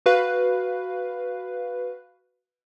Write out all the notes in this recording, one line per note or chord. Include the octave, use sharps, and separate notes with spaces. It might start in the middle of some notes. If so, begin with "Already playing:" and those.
F#4 B4 F5